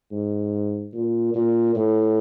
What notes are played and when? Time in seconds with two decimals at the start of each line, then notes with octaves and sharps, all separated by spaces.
0.12 G#2
0.93 A#2
1.35 A#2
1.75 A2